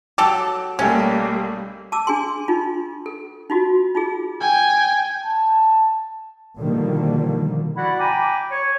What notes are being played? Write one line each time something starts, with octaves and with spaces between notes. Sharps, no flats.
F#3 G4 A4 D6
B1 G3 A3 A#3 C#4 G5
A5 D6 E6
D4 G#4 G#5 C6
D4 D#4 F4
A4
D#4 F4 F#4
D#4 F4 G#4
G5 G#5
A5
B2 D3 D#3 F3 G3 A#3
E4 F#4 D5 F#5 B5
G5 G#5 A#5 B5 D6
C#5